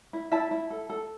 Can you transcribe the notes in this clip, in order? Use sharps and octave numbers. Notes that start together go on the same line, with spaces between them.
E4
E4 E5 A5
E4
A4
A4